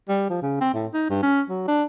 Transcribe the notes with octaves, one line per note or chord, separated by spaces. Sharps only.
G3
F3
C#3
C4
A2
D#4
G2
C#4
F#3
D4